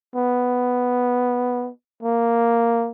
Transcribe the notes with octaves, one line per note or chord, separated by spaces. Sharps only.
B3
A#3